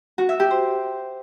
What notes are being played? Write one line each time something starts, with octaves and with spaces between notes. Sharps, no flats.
F#4
E5
G4
C5